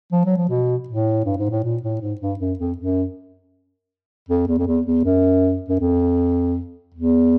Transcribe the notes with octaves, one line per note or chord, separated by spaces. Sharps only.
F3
F#3
F3
B2
A2
G2
G#2
A2
A#2
A2
G#2
G2
F#2
F2
F#2
F2
E2
F2
E2
E2
F#2
F#2
F2
E2